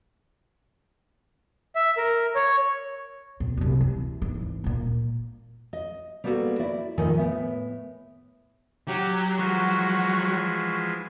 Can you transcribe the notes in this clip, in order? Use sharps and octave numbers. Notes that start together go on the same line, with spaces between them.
E5
A#4
C#5
A#2 C4
C2 F#2
E3
G#1 E3
A#2 A#3
D#5
G3 A#3 B3 D#4 F#4 A4
E4 D5
A2 D#3 F3 D#4 D#5 G#5
A2 B3 E5
F#3 G4
E3 F3 G#3 F#4